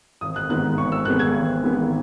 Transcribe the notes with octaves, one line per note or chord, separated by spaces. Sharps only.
G#1 D#6
F#6
G#2 D#3 G#3 B3 F#6
G#1 C#6
E6
G#2 D#3 G#3 B3 F#6
G#6
G#1
G#2 D#3 G#3 B3